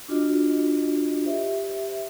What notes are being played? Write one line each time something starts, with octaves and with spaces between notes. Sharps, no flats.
D4 F4 F#4 D#5
G4 C5 E5